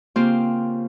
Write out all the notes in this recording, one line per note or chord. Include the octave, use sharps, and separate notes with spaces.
C#3 A#3 C4 F4 G4 C5